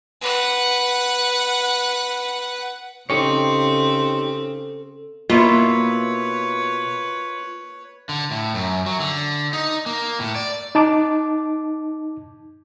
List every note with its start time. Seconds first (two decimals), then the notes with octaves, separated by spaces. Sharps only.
0.21 B4 F#5
3.10 C#3 C4 D#4 G4 A4 C#5
5.30 B2 A#3 E4 F4 B4 C#5
8.09 D3
8.31 A2
8.54 F#2
8.86 F#3
9.00 D3
9.53 D#4
9.86 A#3
10.20 A2
10.35 D5
10.75 D#4 A5 D6